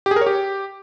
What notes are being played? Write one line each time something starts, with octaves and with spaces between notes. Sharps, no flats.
G4
G#4
A#4
C#5
G4